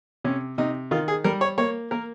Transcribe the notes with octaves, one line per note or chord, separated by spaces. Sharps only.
C3 C#4
C3 D#4
D#3 F4
G#4
G3 A#4
C#5
A#3 C#5
A#3 A#4